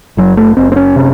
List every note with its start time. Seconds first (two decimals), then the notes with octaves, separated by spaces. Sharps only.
0.17 F#1 F#3
0.37 A3
0.57 F#1 C4
0.72 C4
0.76 C#4
0.96 C3